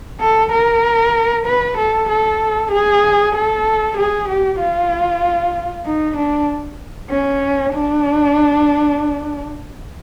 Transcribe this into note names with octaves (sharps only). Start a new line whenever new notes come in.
A4
A#4
B4
A4
A4
G#4
A4
G#4
G4
F4
D#4
D4
C#4
D4